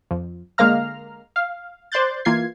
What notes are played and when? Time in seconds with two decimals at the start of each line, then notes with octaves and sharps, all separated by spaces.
0.11 F2
0.58 D3 G#3 A#3 F5 A#5 F6
1.36 F5
1.92 C5 D5 C6 F#6 G6 A6
2.25 E3 A#3 F4 G#6 C7